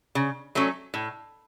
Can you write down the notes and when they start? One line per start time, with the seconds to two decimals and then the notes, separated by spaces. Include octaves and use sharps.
0.15 C#3
0.55 F#3 A3 C#4
0.94 A2